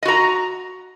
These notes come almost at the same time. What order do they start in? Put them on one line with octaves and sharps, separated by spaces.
D#5 F#4 A#5